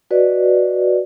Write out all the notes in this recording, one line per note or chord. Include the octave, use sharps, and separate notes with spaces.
F#4 B4 D5 D#5